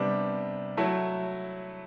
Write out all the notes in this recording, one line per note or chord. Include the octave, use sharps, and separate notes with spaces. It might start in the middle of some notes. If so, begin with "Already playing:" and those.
Already playing: C3 G3 B3 D4
F#3 A3 E4